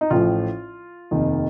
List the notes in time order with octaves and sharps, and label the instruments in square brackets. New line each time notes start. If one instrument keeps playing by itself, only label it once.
[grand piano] D#4
A1 A2 F3 F4
F1 D#2 D#3